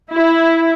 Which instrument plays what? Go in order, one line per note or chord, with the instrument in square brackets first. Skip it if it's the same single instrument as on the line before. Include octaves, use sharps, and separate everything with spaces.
[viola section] E4